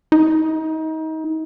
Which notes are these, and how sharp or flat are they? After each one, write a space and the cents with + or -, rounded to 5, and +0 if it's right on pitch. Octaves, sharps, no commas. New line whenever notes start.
D#4 +30